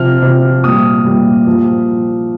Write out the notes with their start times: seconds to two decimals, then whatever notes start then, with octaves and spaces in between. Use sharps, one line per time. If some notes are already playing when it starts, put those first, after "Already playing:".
Already playing: C3 F3 F6
0.22 C3 F3
0.64 A#2 G3 D#6
1.05 A#2 G3
1.47 A#2 F3